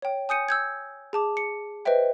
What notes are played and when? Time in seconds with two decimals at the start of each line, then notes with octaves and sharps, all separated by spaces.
0.02 C#5 G5
0.29 G#5 D#6 G6 C#7 D#7
0.49 E6 G6 G#6
1.13 G#4 A5 D6
1.37 C#7
1.85 B4 C5 D#5 E5 G5